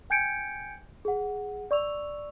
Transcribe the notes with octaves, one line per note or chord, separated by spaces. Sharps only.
G5 G#5 G6 G#6 C#7 D7
G#4 F#5
D5 C#6 E6 F7